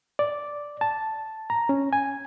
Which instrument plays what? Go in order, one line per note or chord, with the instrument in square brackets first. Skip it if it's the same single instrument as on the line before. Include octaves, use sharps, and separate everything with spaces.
[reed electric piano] D5
A5
A#5
C#4
G#5